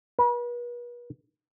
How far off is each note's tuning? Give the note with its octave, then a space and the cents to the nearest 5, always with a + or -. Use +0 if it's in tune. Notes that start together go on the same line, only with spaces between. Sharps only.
B4 -40